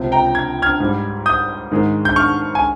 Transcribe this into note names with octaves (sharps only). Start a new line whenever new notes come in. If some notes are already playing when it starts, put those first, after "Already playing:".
Already playing: C#2 C3 F3
G5 A#5
G#6
F6 G#6
G#2 G3
D#6 G6
G#2 D#3 G#3
G6
C#6 F6
G#5